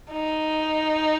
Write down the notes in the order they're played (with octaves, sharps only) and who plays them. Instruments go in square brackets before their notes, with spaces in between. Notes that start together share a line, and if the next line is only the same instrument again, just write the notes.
[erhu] D#4